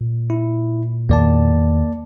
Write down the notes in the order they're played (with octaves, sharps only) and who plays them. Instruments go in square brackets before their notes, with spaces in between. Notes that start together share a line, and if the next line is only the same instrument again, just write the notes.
[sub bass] A#2
[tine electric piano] E4
[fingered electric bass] E2 D#3 [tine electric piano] A#3 D5 A5